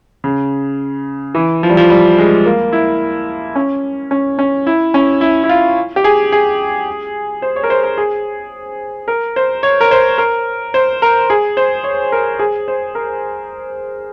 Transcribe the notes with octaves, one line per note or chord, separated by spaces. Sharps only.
C#3
E3
F3
G3
F3
G3
G#3
A#3
E4
C#4
C#4
C#4
E4
C#4
E4
E4
F4
G4
G#4
G#4
C5
C#5
A#4
C5
A#4
G#4
A#4
C5
C#5
A#4
C5
A#4
C5
A#4
G#4
C5
C#5
A#4
G#4
C5
A#4